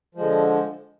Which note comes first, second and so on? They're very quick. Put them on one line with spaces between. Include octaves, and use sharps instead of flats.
F3 G#3 D3